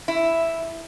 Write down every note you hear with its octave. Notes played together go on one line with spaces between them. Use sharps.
E4